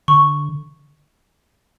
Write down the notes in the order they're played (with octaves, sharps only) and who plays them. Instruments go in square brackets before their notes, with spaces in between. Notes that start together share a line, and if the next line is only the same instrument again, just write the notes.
[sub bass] D3 [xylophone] C#6